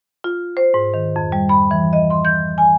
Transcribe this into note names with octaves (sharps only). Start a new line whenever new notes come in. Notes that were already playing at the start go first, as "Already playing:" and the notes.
F4
C5
G#2
D#3
F2
G3
B5
E3
D#5
C6
G6
G#5